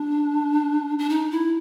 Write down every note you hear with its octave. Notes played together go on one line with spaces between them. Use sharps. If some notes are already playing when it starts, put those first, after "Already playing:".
Already playing: D4
D4
D#4
E4